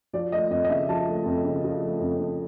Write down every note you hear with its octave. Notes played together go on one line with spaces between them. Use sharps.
F3 D5
A3 D#5
F2 D#5
D#5
C#3 E5
F3 A5
A3
F2
C#3
F3
A3
F2
C#3